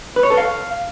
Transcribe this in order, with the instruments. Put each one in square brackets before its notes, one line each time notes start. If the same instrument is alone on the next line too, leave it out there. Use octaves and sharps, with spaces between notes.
[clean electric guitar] B4
C#5
A4
F5